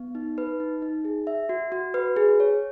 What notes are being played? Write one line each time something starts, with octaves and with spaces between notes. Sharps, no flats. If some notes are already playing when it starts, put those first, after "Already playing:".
Already playing: B3
D#4
B4
D#4
D#4
G#4
E5
F#4
F#4
B4
G#4
C#5